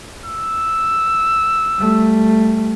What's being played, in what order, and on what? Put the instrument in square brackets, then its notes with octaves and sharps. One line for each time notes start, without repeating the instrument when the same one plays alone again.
[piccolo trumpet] E6
[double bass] G3 A3